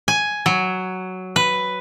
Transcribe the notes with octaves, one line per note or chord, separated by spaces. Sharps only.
G#5
F#3
B4